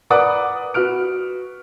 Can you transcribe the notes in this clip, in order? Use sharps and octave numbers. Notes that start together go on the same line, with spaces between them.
A#4 B4 D5 F#5 D6 D#6
F#4 B4 F6 D7